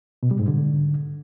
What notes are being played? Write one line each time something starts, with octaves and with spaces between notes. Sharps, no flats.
B2
G3
G#2
D3